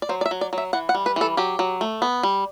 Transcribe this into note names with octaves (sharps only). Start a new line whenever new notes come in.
D5
F#3 C5
D5
E5
F#3
D5
F#3
E5
E3 F#5
F#5
G3
B4
E3 A4
F#3 G4
F#3
A3
B3
G3